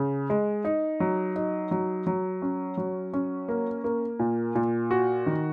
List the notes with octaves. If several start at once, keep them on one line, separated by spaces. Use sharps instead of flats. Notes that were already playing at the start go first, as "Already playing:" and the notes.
Already playing: C#3
G#3
D#4
F#3
D#4
F#3
F#3
C#4
F#3
C#4
A#3
A#3
A#2
A#2
F#4
D#3